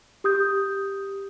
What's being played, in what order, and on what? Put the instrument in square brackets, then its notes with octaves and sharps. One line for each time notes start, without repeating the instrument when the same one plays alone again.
[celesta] G4 D#6 G6